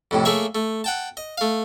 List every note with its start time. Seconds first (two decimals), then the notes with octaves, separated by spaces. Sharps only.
0.11 F2 A2 C3
0.25 A3 A#3 G#4 C#5 E5
0.55 A3
0.84 F#5 G5 A5
1.17 D#5
1.38 A3 F5